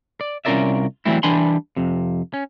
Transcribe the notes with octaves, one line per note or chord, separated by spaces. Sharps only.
D5
C2 C#4 F4 A#4 D5 E5
E3 F#3 G3 A3 C4 E4
E3 G3 D4 G#5 B5 C6
F2 C3
C#4